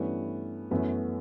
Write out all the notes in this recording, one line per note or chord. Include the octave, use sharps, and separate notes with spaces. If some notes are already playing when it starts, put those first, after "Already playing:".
Already playing: G2 E3 A3 B3 C#4
F#2 E3 A3 B3 C#4